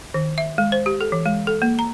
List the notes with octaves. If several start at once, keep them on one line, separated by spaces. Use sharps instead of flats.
D#3
E5
G#3
C5
G4
A4
E3
G#3
A4
A#3
A#5